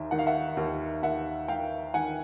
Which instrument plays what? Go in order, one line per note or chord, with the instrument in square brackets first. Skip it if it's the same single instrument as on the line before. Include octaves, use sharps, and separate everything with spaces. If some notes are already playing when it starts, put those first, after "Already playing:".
Already playing: [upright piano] D#2 D#3 E5
D#3 F#5
F5
E5 F#5
D#2
D#2 E5 F#5
D#3 F5 G5
D#3 F#5 G#5